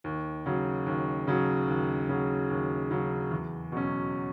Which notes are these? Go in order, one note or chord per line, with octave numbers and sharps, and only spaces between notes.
D#2
C#3 F#3
D#2
C#3 F#3
D#2
C#3 F#3
D#2
C#3 F#3
E2
B2 F#3 C#4